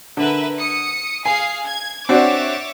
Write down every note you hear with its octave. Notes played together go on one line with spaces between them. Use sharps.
D3 A#4 B4 E5
D#6 C#7
G#4 F5 G#5 C7
G#6
C4 D4 F#4 C#5 E5 D6